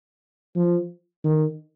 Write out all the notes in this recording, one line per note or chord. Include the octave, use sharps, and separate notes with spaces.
F3
D#3